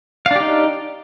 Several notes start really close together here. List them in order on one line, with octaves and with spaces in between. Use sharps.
F5 D4 G4 D#4